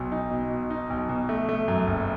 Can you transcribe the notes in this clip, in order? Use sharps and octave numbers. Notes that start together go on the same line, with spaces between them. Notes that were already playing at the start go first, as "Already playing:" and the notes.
Already playing: B1 B2
D#4
B2
B2
D#4
B1
B2
A3
A3
F#2
F#1